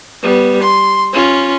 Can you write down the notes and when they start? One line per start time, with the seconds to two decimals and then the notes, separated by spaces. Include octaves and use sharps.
0.22 G3 B3
0.62 C6
1.13 C#4 F4